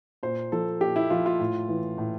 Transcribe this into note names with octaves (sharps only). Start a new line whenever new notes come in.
A#2 C5
F3 A4
A#2 G4
E4
F3 F4
F4
A2
E3
A2